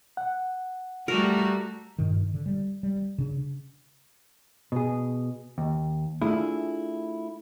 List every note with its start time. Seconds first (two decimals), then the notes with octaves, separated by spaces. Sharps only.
0.17 F#5
1.08 G3 A3 F#4 A#4
1.99 G2 A#2 D#3
2.34 D3
2.46 G3
2.83 G3
3.18 C#3 D4
4.72 B2 G#4
5.58 D#2
6.21 A3 D4 E4 F4 G#4